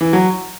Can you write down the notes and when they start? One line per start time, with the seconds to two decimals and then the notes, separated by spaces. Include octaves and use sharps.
0.01 E3
0.13 F#3